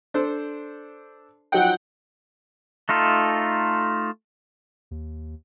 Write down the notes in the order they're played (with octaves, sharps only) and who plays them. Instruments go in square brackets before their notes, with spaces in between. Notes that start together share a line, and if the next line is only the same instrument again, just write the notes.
[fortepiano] D4 A4 C5
[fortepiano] F3 F#3 D#4 [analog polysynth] F#5 G5
[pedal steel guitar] A3 D#4 F4 A4
[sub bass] D#2